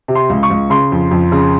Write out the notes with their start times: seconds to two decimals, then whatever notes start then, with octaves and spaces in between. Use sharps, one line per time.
0.08 C3
0.15 C6
0.30 C#2
0.43 C#6
0.50 C#2
0.70 C#3 C6
0.92 F2
1.11 F2
1.32 C#3